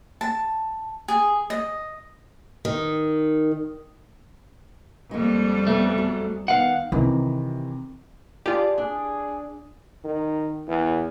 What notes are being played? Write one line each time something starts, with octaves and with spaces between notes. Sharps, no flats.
A5
G#4
D#5
D#3
F2 G3 G#3 A#3
C#3 A3 B3 B4
F#3 G#4
D#3 B3 F5 F#5
C3 D#3 E3 C4
F4 G4 G#4 D5 A5
D4 G#4
D#3
E2